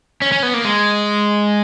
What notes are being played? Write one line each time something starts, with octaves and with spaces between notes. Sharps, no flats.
C#4
C#4
B3
A#3
G#3